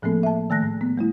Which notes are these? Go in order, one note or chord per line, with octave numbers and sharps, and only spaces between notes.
A2 F3 A3 A#3 C4 A4
E5 A5
D#3 A3 A5 F#6 A#6
A2
B3
G3 A3 E4